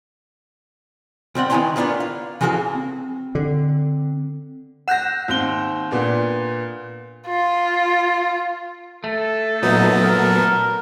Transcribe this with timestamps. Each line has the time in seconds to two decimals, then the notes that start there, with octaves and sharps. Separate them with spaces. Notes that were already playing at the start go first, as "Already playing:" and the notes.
1.35 C#2 G3 C4 F#5
1.50 D#3 B3 E4 G#5 A#5 C6
1.76 G3 A#3 B3 D4 F4
2.00 F5
2.41 C#3 E3 F3 F#4 A4 F5
2.75 C4
3.35 D3
4.88 F#5 F#6 G6 A#6 E7
5.28 D#2 C4 G7
5.91 A#2 B3 D4
7.27 F4
9.04 A3 A4
9.62 A#2 F#3 B3 D#4
10.03 A#4